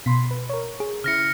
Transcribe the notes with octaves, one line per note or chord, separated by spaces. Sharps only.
B2 B5 C6 B6
B4
A#4 C#5
G#4
C#3 E4 F6 A#6 C#7